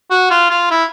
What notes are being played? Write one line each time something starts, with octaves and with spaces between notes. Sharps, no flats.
F#4
F4
F4
E4